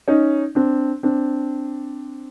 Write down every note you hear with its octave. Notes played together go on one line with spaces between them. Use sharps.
C#4 D#4
C4 D4
C4 D4